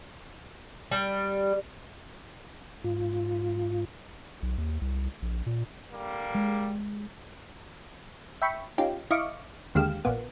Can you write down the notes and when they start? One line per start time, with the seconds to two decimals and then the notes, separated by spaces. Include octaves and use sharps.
0.91 G3
2.84 G#2 F4
4.43 B1
4.58 D#2
4.81 C2
5.22 A#1
5.46 A#2
5.92 D3 G3 A#3
6.35 G#3
8.42 E5 G5 B5 C#6
8.78 C#4 D#4 F4 G4
9.11 E4 D#5 F5 C#6 D6
9.75 D#2 D3 G#3 G4 F5 E7
10.05 A#1 A#3 B3